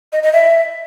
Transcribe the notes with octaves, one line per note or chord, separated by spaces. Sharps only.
D#5
D#5
E5